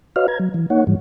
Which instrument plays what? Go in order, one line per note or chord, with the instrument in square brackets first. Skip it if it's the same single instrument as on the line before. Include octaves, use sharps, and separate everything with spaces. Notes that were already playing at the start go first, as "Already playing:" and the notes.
[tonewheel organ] F#4 B4 C#5 D#5 F5 F6
B4 A#5 G#6
F#3
E3
A#3 D#4 C#5 F#5
G#2 E3 G3